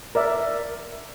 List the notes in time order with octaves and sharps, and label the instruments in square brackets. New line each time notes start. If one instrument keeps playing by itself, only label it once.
[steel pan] A#4 D5 E5